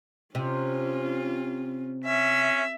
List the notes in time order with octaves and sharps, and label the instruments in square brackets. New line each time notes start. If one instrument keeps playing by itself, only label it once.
[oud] C3 [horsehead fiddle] C#4 F4
[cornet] C#4 [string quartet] E5